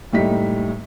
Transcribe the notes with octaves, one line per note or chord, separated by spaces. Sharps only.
F#1 A2 G3 D#4 B6